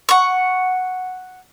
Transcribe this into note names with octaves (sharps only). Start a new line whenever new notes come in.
F#5 C#6